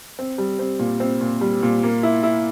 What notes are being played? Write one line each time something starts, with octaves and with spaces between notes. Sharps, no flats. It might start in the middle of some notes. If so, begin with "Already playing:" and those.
C4
G3
C4
A#2
C4
A#2
G3
A#2
A#3
E4
E4